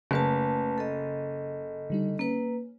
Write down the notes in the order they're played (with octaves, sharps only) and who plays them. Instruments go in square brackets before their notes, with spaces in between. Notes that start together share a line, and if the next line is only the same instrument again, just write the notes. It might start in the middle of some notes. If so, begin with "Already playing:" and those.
[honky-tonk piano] F#1 [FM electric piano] C#3 [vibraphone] A3 B4 A5
[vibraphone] A4 D#5
[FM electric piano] D3 G3 D#4
[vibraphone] A#3 B4 [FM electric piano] C#4